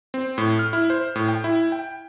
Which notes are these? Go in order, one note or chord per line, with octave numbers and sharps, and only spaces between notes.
C4
A2
F6
E4
C5
A2
G5
E4
G5